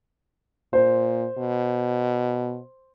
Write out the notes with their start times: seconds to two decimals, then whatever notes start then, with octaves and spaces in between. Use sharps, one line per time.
0.73 A#2 C5
1.38 B2